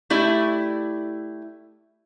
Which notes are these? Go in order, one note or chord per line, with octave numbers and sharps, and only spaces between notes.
A3 E4 G4 D5